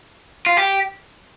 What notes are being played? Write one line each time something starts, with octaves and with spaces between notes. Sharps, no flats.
F4
G4